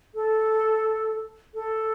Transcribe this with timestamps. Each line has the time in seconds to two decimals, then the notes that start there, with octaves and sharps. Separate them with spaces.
0.15 A4
1.54 A4